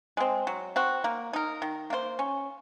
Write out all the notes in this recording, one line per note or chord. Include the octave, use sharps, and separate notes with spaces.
G#3 C4
F#3
C4 F#4
A#3
D#4 A#4
D#3
A#3 F4 C5
C#4